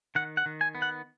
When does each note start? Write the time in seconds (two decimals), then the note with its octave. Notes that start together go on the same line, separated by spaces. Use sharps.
0.15 D#3 F#5
0.37 F#5
0.46 D#3
0.61 G#5
0.75 B3
0.82 F#5